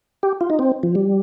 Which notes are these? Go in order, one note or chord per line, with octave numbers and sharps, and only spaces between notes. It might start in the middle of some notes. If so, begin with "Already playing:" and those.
G4
F4
D#4
C4
F3
G3